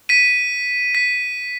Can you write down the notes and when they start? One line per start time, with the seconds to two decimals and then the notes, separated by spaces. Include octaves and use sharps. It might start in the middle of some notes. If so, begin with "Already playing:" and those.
0.09 B6 D#7
0.95 B6